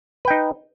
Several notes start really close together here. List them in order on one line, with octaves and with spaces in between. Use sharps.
B4 G5 D#4